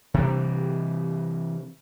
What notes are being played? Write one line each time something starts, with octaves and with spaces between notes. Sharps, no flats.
C3 E3 G3